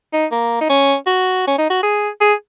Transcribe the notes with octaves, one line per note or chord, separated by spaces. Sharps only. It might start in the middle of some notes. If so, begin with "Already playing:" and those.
D#4
A#3
D#4
C#4
F#4
C#4
D#4
F#4
G#4
G#4